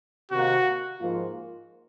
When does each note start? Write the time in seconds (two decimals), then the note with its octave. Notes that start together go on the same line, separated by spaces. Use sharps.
0.31 C3 D#3 A#3 F#4
1.00 G#2 F3 A#3 F4